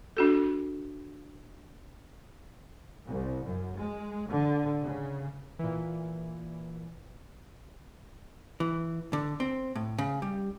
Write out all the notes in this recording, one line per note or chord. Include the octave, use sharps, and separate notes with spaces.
D4 F#4 A4
C2
F#2
G#3
D3
C#3
A#2 E3
E3
D3
C4
A2
C#3
G3